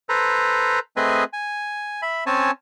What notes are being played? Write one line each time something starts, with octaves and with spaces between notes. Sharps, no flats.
A4 B4 C5 A#5
A3 C4 G#4 B4 D#5 G#5
G#5
E5 B5
C4 C#4 C#5 G#5 A5